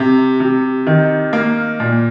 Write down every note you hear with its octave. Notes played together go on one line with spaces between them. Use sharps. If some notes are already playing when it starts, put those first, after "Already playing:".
Already playing: C3
C3
D#3
A#3
A#2